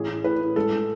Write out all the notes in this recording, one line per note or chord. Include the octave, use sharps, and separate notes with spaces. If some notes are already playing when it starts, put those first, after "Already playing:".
Already playing: A1 G#4
A2
A2 B4
A2
G#3 A4
G#3